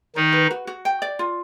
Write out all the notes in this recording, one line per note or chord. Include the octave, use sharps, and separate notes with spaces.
D#3 D#4 D5
B4
F#4
F#4
G5
D5
F4